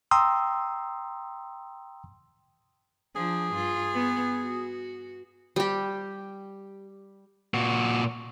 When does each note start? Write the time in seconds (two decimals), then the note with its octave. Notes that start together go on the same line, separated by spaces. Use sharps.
0.11 G5 A#5 C6 D#6 E6
3.16 F3 D4 G#4
3.54 G2 F4
3.94 B3
4.41 F#4
5.56 G3 G4
7.54 A#2 F#4